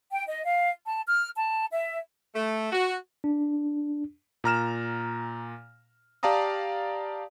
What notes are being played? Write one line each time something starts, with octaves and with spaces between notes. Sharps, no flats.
G5
D#5
F5
A5
F6
A5
E5
A3
F#4
D4
A#2 A#5 F6 E7
G4 D5 F5 A5 A#5 D#6